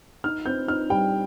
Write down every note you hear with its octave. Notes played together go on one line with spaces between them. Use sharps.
D#4 F6
C4 G6
D#4 F6
G3 G5